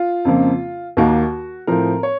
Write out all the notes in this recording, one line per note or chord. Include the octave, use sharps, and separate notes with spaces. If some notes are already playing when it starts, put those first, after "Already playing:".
Already playing: F4
F2 C#3 F3 A#3
D#2 D#3 A#3 F#4
A2 F3 C4 A#4
C#5